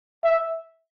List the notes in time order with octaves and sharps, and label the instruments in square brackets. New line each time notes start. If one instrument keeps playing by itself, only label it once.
[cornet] E5